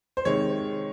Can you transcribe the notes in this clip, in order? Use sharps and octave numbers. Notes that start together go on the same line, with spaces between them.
C5
C3 D#3 G#3 C#5